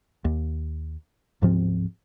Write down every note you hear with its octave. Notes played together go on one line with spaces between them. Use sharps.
D#2
D1 G#2 F3 C4